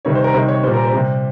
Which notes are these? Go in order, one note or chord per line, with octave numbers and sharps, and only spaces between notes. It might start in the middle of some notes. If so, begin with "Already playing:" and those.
C3 D#3 G3 C#5
C5
A#4
C3 D#3 G3 C5
C#5
A#2 G3 C5
A#4
C5
C3 G3